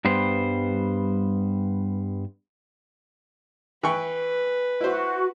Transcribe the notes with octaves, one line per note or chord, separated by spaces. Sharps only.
G2 G3 B3 C5
E3 B4 G5 C#6
E4 F#4 C5